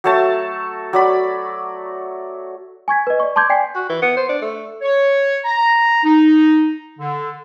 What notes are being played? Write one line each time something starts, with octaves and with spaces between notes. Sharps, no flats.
F#3 A3 A5
F#3 D5 B5
G#5 C#6 G#6 B6
B4 D#5
D5 C#6
A5 C6 D6 G6 G#6
D5 G5 G#5 B6 C7
F#4
E3
B3
C5
D4
A3
C#5
A#5
D#4
D3